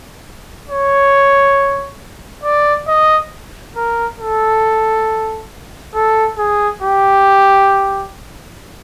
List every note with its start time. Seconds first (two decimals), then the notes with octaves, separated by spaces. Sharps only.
0.70 C#5
2.44 D5
2.88 D#5
3.76 A#4
4.20 A4
5.95 A4
6.38 G#4
6.83 G4